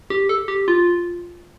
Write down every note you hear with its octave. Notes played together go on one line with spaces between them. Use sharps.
G4
A4
G4
F4